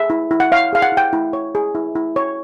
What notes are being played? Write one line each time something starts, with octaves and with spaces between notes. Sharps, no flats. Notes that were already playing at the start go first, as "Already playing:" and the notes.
Already playing: G#4 E5
E4
E4
F#5
C#5 F5
G#4 F5
F#5
E4
G5
E4
C#5
G#4
E4
E4
C#5